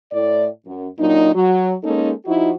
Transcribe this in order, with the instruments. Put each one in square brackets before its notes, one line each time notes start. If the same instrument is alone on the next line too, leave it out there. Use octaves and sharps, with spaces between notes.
[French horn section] A2 D5
F#2
F#2 A#2 F#3 D4 D#4
F#3
G#3 A#3 C#4 D#4 A4
F3 D#4 E4 F#4